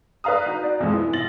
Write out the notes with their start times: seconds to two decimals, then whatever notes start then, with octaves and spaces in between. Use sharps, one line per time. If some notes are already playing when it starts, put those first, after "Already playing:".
0.24 B4 D5 F5 A#5 D#6
0.46 D#4 F#4
0.63 D5
0.80 B1 F2 F3 G#3
0.92 E3
1.13 B1 A6 A#6 F#7